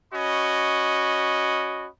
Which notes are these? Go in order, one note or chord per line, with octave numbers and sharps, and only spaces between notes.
C#4 F#4 D#5 B5